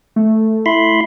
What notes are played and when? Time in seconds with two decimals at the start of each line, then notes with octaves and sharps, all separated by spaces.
0.16 A3
0.66 E4 B5 C6